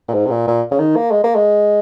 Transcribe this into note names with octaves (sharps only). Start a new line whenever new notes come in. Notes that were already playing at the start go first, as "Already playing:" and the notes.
A#2
G#2
C3
A#2
A#2
C#3
D#3
A#3
G#3
A#3
G#3